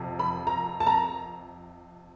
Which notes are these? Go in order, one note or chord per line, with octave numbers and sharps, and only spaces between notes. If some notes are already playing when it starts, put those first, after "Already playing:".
Already playing: F2 C3 F3
B5
A#5
A5
A#5